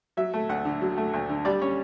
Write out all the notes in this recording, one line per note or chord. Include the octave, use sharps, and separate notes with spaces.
F#3 E5
A3
D2 F#5
D3
F#3
A3
D2
D3
G3 D5
C#4 C#5